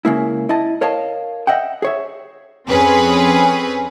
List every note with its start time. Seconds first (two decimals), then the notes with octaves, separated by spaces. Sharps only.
0.05 C#3 G#3 A#3 E4
0.49 E4 D#5 A5
0.81 A#4 C#5 D#5 F5 A5
1.47 D#5 E5 F#5 G5
1.82 G#4 C#5 E5
2.68 F2 C4 C#4 G#4 B4